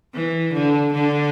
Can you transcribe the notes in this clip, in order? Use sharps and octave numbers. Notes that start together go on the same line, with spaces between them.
E3
D3
D3